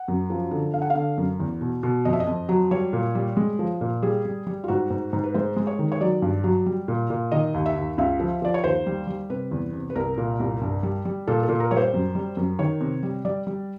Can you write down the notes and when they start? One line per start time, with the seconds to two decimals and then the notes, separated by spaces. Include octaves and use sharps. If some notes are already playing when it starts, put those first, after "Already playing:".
Already playing: F#5
0.08 F#2
0.30 F3
0.51 D3
0.74 D3 F5
0.82 F#5
0.90 F5
0.95 D3
1.18 F#2
1.40 E2
1.61 B2
1.83 B2
2.05 F2 D#5
2.13 E5
2.20 D#5
2.27 F2
2.49 F#3
2.71 G3 C#5
2.93 A#2
3.15 G3
3.37 G#3
3.59 F3
3.81 A#2
4.02 G3 G#4
4.25 G3
4.47 G3
4.64 F4
4.68 G#2 F#4
4.90 G#2
5.13 G#2
5.24 B4
5.34 G#3 C5
5.56 G#3
5.67 C#5
5.79 D#3
5.92 C#5
6.01 F#3 D5
6.22 G2
6.44 F#3
6.66 G3
6.88 A#2
7.10 A#2
7.32 D#3 D#5
7.54 D#2
7.66 E5
7.76 D#2
7.98 C#2 E5
8.20 F3
8.42 F3 D5
8.54 C#5
8.63 D#2 C5
8.86 G3
9.07 G3
9.30 C3 B4
9.51 E2
9.73 C3
9.90 B4
9.95 C2 A#4
10.18 A#2
10.40 C2
10.61 G2
10.83 G3
11.05 G3
11.27 A#2 A4
11.43 A4
11.49 A#2
11.60 A#4
11.71 G3 C#5
11.77 C5
11.93 F#2
12.15 G3
12.37 F#2
12.59 D#3 C#5
12.81 C3
13.03 G3
13.25 G3 D5
13.47 G3